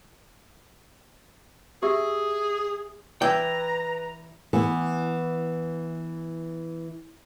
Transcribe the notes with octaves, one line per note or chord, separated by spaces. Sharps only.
G4 G#4 E5 E6
E3 E4 B4 D5 G5 A#5
E3 B3